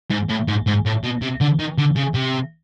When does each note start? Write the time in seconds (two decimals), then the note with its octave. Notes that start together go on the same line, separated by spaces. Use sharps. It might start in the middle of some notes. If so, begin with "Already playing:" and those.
0.11 G#2
0.30 A2
0.48 G#2
0.67 G#2
0.86 A2
1.04 B2
1.22 C3
1.41 D3
1.59 D#3
1.78 D3
1.97 C#3
2.15 C3